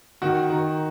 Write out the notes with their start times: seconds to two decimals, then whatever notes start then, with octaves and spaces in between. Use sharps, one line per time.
0.22 D#3 F#4
0.50 D#3